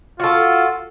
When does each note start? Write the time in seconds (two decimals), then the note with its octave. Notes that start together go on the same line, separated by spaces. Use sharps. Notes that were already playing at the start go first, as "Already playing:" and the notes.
0.20 F4 F#4 A4